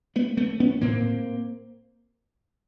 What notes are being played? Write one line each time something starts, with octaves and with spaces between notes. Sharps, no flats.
A3 B3
A3 B3
B3 C#4
A2 A#3 C4